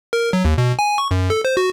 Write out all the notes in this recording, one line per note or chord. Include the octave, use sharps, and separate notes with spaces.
A#4
F#3
D#2
B2
G#5
C#6
F#2
A4
C5
F#4